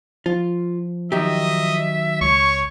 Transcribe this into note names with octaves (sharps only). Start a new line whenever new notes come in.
F3 F4
D#3 F#3 G4 D#5 E5
C#2 C#5 C#6